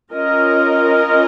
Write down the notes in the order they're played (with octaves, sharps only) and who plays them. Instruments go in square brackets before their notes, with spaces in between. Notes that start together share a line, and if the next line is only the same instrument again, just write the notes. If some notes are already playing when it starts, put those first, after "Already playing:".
[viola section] C#4 F4 A#4 D#5